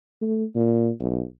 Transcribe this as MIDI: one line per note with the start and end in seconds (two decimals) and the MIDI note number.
0.22 0.44 57
0.55 0.90 46
1.00 1.23 35